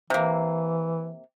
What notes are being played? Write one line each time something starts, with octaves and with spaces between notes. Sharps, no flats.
C3 E3 A#3